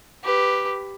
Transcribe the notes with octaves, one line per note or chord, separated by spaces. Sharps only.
G4 B4